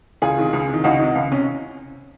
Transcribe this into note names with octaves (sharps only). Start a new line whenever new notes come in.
C#2 F4 G#4
C3 D#3
C#2
C3 D#3
C#2 D#4 F#4
C3 D#3
C#2
C3 C#4